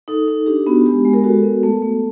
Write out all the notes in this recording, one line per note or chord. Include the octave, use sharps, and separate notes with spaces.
D#4 A4
D#4
D4 G4
B3 F#4
G#3 G4
G#3
A#4
F#4 A4
B3
A3
A3